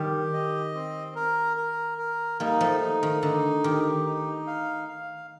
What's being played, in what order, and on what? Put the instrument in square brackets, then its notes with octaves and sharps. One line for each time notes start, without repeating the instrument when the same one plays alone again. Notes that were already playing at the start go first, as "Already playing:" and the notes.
Already playing: [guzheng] D#3 G3 [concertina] G4
[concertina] D#5
C4
A#4
A#4
A#4
[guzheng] G3 A#3 [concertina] D#4
[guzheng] F3 A3
[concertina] D#4
[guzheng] D#3
[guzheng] D3 [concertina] D#4
[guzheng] D#3 [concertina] G4
[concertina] D#4
F5
F5